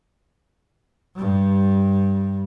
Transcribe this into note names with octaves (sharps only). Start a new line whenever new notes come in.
G2 G3